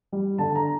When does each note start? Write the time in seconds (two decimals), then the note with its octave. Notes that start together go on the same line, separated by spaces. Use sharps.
0.12 G3
0.38 D3 A5
0.55 A#5